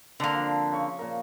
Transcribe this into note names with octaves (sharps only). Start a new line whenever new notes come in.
D3 A#3 C4 D4
F3
C#3 C#6
A#2 A#4